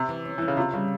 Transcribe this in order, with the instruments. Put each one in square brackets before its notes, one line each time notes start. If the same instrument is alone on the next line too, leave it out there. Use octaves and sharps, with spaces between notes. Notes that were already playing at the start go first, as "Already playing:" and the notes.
Already playing: [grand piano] C3
[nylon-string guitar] E3
C#4
[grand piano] E3 [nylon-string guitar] C#4
[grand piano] C#3
[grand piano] C3 [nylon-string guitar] F4
[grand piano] C#3 [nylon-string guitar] G3